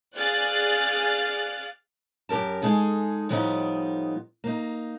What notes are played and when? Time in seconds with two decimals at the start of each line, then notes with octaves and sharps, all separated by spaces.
0.16 G#4 D5 F5 F6 F#6 A6
2.29 F#2 G4 A#4 A5
2.62 G#3 D#4 G#4 A4
3.29 A2 F3 G3 B3 C#4 D#4
4.44 A#3 D#4